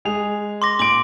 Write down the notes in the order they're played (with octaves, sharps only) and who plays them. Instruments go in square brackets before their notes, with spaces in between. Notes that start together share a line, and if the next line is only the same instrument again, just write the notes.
[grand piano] G#3 G#4 F7
[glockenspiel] C6 D6 A#6
[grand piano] A#2 D7 [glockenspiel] D6 F#7